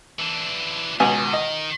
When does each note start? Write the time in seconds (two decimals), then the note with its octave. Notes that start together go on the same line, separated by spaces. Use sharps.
0.19 E3 D4
1.00 C#2 B2 D#3 G#5
1.33 D#5